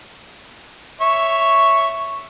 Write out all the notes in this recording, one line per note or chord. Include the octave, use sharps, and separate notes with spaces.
C#5 E5